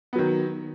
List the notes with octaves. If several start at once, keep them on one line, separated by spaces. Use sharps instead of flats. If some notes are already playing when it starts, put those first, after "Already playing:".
D#3 F#3 B3